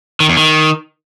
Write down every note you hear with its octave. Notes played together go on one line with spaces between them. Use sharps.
D#3
E2
D#3